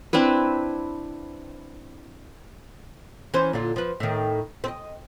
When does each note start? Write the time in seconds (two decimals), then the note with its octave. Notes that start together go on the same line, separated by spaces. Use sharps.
0.13 C4 D4 E4 B4
3.34 E3 C#4 C5
3.53 A#2 D3 F4
3.76 F3 B4
4.00 A2 D#3
4.64 C4 D#5